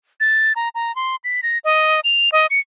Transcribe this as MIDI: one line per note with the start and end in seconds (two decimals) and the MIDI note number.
0.20 0.53 93
0.56 0.69 82
0.75 0.94 82
0.96 1.16 84
1.24 1.41 95
1.43 1.58 94
1.64 2.00 75
2.04 2.29 101
2.32 2.47 75
2.50 2.60 97